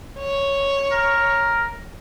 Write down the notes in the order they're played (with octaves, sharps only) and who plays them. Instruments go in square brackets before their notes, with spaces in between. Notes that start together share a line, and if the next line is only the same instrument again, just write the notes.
[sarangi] C#5
[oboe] A#4